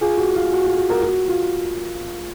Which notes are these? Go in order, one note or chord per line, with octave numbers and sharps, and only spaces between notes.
F4 G#4
F#4
F4
F#4
F4
F#4
F#4 A#4
F#4
F4